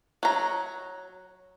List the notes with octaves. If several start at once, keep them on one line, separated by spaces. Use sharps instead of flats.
F#3 A#5